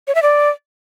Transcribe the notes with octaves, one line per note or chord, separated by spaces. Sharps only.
C#5
E5
D5